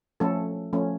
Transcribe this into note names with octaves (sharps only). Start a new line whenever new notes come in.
F3 A3 C#4 A4
F3 A3 C#4